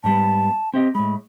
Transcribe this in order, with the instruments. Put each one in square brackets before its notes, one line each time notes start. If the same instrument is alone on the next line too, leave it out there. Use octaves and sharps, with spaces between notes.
[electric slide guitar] G#2 G3 B3 [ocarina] A5
[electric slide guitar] C4 G4 D#5
[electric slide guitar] A2 G#3 [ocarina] B5